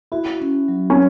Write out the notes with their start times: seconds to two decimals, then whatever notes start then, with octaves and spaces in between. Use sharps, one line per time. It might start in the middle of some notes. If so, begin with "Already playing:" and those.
0.12 E4 F#4
0.41 C#4
0.68 F#3
0.90 C#4